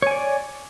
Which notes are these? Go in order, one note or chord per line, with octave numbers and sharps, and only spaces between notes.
C#5 D5 G#5